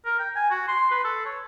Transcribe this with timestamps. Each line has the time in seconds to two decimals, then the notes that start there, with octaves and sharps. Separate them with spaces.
0.06 A#4
0.20 G5
0.36 G#5
0.51 F#4
0.68 C6
0.91 B4
1.04 A4
1.25 C#5